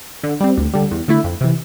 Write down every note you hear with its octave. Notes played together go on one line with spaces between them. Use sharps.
D3
G3 C4
D2
D3 G3
E2
D3 A3 E4
F2
C3 E3